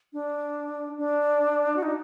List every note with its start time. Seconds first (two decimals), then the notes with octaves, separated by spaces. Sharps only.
0.13 D4
0.98 D4
1.76 F#4
1.83 D#4